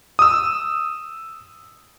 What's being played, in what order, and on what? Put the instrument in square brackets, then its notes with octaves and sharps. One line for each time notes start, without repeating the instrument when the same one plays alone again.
[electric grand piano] D#6 E6